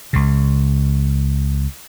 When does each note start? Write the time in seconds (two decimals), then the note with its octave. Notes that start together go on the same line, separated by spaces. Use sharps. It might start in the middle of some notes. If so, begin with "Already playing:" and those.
0.13 C#2 C#3